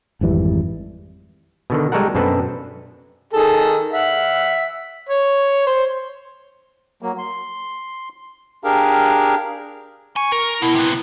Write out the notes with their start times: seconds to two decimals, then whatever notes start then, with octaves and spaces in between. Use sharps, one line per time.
0.21 G#1 F2 E3 G3
1.70 B2 D3 D#3
1.92 G3 G#3 F#4 A4 A#4 F#5
2.15 F#2 B2 C4 D4 A4 B4
3.33 D#3 G#4 A4
3.93 E5 F#5
5.09 C#5
5.67 C5
7.02 F#3 A#3
7.18 C6
8.64 D4 G4 G#4 A#4 F5
10.16 G#5 C#6
10.32 A#4
10.62 B2 E4
10.75 C3 B3